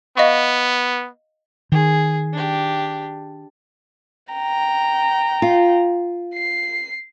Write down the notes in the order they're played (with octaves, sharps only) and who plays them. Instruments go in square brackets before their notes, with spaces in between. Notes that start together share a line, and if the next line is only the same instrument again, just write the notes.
[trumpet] B3 [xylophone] D#5 F5 C#6
[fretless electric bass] D#3 [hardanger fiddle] G#4
[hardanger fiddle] D4 G4
[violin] G5 A#5
[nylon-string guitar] F4
[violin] C7